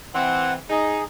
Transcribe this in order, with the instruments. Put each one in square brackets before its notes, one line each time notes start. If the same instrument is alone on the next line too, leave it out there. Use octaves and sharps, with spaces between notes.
[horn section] E3 C4 [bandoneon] F#5
[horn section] D#4 [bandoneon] G#4